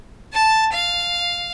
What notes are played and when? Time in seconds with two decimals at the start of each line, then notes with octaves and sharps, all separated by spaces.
0.33 A5
0.72 F5